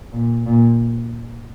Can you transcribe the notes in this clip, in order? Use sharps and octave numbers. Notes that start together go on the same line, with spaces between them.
A#2
A#2